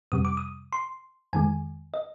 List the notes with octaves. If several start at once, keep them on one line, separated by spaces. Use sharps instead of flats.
F2 C3 G3 D#6
D6
D#6
C6
F2 D#3 G#3 G#5
D#5